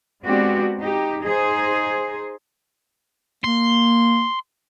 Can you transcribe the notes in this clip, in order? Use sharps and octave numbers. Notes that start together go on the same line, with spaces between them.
G#3 B3 C4 D4 F#4 G4
D#4 G4
D#4 G#4 C5
A#3 C6